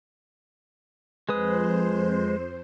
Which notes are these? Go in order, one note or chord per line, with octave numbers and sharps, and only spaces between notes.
F2 G#3 B4 C5 D#6